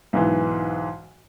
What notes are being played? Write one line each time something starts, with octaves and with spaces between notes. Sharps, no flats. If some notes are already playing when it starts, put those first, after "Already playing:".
B1 G#2 E3